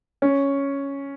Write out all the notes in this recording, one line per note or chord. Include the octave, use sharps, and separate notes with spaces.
C#4